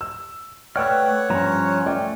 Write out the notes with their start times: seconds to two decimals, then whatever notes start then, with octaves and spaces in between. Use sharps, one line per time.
0.01 E6
0.76 A3 B4 C#5 D5 F#5 G5 E6 F6
1.30 G2 F3 C#4 A#5
1.86 A3 D5 G5